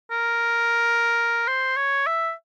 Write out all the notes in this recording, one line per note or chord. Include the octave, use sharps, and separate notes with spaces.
A#4
C5
C#5
E5